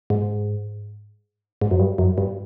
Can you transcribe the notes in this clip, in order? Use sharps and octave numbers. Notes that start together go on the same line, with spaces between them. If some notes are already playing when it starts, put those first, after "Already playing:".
G#2
G#2
F#2
G2
F#2
G2